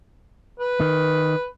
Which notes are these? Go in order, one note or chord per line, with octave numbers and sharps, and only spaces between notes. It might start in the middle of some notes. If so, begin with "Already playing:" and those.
B4
D#3